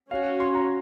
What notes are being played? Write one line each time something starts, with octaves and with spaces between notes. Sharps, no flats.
C#4 F#4 C#5 F5
C6
A#5